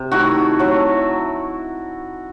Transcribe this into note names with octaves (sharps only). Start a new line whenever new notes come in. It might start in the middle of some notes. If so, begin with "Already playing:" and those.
Already playing: C3
D#3 A3 E4 F#4
F#3 A3 E4